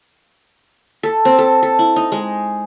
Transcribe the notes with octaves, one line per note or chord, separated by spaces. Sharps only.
A4
C4
A4
A4
E4
D#4
G#3